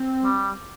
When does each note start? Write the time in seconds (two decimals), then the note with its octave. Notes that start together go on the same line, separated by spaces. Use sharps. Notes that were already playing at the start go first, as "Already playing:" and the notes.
Already playing: C4
0.23 G3